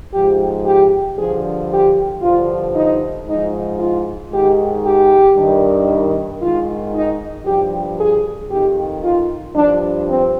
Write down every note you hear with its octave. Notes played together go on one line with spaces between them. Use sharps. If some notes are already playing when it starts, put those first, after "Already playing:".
G#2 F3 G4
G4
G2 D3 F3 G#4
G4
G2 D3 F3 F4
D#4
G#2 F3 D#4
F4
G#2 D#3 G4
G4
G2 D#3
G#2 D#3 F4
D#4
G2 F3 G4
G#4
F2 D#3 G4
F4
G2 F3 D4
C4